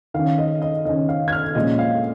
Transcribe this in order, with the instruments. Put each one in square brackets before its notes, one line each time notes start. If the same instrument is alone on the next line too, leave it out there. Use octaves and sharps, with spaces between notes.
[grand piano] D#3 C#4 F5
D#5
D#5
D#3 C#4 D#5
F5
G#6
F6
A#2 F3 G#3 C#4 D#5
F5